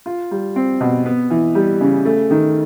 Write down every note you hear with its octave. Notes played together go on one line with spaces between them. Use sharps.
F4
G3
C4
B2
B3
E3
G3
C#3
A3
D#3